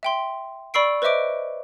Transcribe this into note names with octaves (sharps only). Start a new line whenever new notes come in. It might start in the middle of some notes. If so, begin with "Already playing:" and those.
E5 G5 C6
D5 B5 C#6 E6 C7 D7
B4 C5 D#5 E5 D6 D7